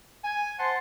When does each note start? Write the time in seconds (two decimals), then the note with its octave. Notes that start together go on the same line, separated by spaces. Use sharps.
0.24 G#5
0.59 C5 F#5 A5 C6